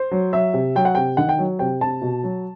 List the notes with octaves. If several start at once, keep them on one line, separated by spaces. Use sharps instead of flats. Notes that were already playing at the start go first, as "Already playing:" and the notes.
Already playing: C5
F#3
F#3 E5
C3
F#3 G5
F#5
C3 G5
D#3 F#5
G5
F#3
C3 G5
C3 A5
B2
F#3